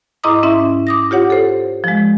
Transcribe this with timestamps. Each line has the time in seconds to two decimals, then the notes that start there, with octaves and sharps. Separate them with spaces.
0.24 G#2 E4 D#5 A#5 D6 D#6
0.43 G#2 C#4 E4 E5
0.87 D6 D#6 A#6
1.11 F4 G4 C#5 F#5
1.30 A4 C5
1.84 F3 G#3